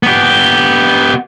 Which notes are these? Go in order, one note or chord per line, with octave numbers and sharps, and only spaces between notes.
B3 G4